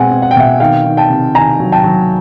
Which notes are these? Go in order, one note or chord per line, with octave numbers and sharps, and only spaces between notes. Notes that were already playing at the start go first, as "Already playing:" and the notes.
Already playing: B2 G#3 C4 F#5 G#5
C4
F#5
G5
B2 E5 F#5
D#3 F5 G5
D#3
G5 A5
C3
D#3 G#5 A#5
F#3
G5 A5
F#3